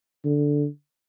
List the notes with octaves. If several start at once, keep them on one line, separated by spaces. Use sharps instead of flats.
D3